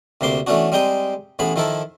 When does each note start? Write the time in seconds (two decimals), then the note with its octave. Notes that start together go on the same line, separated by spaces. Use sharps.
0.21 D2 C3 A#3 C6 D6
0.47 E3 A3 B3 C#4 D4 F#4
0.72 G3 G#3 C4 G5 A#5 D#6
1.39 A1 A2 B3 G#4 B5
1.56 D#3 F3 E4 A4 A#4